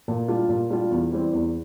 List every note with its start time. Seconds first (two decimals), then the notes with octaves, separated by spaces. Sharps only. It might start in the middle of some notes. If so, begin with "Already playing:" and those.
0.08 A#2
0.28 G3 D4 F4
0.49 A#2
0.70 G3 D4 F4
0.91 E2
1.11 E3 G3 C4
1.33 E2